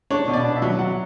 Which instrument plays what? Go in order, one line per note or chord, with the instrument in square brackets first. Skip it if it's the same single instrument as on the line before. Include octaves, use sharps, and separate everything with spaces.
[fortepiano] D4 C#5
B2
D5
D4
E5
F#3
F#3 F#5